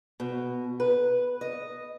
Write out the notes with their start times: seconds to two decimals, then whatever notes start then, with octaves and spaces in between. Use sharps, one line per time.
0.20 B2
0.80 B4
1.41 D#5